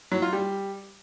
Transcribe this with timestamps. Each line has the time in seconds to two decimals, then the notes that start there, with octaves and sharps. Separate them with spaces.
0.12 F#3
0.22 F4
0.33 G3